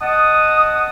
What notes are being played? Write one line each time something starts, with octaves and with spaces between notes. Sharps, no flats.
D#5 F#5 A5 D#6